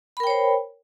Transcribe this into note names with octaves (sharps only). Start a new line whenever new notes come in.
A#4 C5 C#5 G5 B5